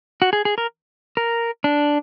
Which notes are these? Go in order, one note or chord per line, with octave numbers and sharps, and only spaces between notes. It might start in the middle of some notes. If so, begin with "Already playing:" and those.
F#4
G#4
G#4
A#4
A#4
D4